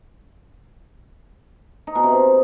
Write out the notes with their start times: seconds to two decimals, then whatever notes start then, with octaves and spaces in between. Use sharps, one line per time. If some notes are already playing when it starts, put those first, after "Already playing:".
1.87 D#4
1.95 B2
2.03 C3